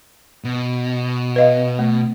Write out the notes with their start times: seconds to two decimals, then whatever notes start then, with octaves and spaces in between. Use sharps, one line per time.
0.44 B2
1.36 B4 D#5 F5
1.79 A3